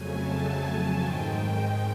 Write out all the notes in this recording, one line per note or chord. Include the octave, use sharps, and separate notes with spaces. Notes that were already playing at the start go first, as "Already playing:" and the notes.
Already playing: F2 C#3 F#3 A3 G#5
A5
G#2 D#3 G#3 G5